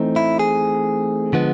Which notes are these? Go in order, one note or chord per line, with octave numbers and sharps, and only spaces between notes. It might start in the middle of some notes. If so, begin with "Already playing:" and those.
Already playing: E3 A3 C4 D#4
E4
G#4
D3 F3 G#3 B3